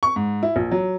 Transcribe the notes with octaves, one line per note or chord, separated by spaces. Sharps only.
C#6
G#2
E4
A#1
F#3